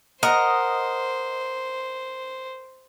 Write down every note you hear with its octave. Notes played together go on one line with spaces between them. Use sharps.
A#4 C5 D#5 F#5